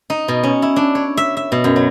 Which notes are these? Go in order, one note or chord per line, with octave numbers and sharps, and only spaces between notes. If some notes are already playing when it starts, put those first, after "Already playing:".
D#4
B2
C#4
E4
D4
C#5
E5
E5
B2
F#2
F#3